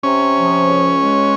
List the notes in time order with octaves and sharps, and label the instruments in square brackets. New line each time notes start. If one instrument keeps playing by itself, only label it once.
[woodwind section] C3 [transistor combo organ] C#4
[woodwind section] F3
C#2
G#3